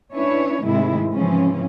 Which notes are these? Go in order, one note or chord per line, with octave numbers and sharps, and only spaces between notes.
C#4 D4 E4 B4 C#5
G#2 C3 D#3 G#3 A3 E4
G#2 C#3 E3 F3 C4 C#4